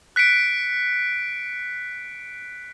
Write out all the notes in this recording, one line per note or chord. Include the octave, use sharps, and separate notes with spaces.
F#6 B6 C#7 D7